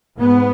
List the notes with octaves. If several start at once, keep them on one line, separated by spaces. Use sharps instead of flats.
G#2 B3